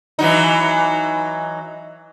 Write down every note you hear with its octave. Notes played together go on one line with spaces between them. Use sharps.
E3 F#3 D#4